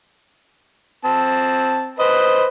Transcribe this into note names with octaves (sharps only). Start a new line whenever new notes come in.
C4 A5
B4 C5 D#5